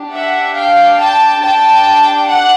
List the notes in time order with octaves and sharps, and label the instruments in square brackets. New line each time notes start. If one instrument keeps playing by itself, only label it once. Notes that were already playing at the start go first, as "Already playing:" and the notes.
Already playing: [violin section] D4 G4
E5 F#5
F5 G5
G5 A5
D4 G4 G5 A5
F#5